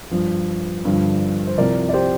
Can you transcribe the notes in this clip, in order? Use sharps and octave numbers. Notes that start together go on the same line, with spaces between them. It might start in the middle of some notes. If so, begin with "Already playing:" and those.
G2 F3
G2 D3 F3
C5
C2 C3 F3 A#4 D5
D5
G4 C5